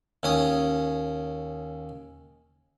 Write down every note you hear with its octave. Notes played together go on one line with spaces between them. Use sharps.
D#2 C#4 D#6